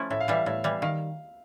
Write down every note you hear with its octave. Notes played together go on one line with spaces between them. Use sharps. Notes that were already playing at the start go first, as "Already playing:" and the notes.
Already playing: F3 A3 C#4 E4
A2 E5
F5
E3 G3 E5
A2 E5
E3 G3
D#3 F5